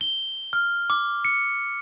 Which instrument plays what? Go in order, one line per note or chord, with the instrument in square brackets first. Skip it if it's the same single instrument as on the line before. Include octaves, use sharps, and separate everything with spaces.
[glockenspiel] G7
F6
D6
C#7